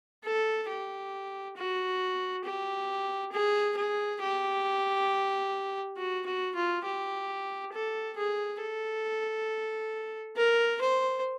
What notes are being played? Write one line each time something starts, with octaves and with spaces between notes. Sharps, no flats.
A4
G4
F#4
G4
G#4
G#4
G4
F#4
F#4
F4
G4
A4
G#4
A4
A#4
C5